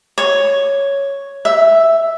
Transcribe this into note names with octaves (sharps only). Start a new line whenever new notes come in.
C#5
E5